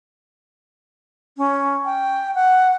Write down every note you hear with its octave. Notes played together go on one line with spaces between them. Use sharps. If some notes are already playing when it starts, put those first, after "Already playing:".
C#4
G5
F#5